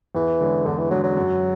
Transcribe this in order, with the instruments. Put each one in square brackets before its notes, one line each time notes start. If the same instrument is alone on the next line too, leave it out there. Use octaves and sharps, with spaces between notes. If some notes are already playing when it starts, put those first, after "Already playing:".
[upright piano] E2 [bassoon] E3
[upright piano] D3 G#3 C#4
[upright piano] E2 [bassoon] D3
[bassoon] E3
[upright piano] D3 G#3 C#4 [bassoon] F#3
[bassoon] F#3
[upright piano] F#2